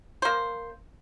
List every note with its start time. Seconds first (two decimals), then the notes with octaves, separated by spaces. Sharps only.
0.22 A#3 C5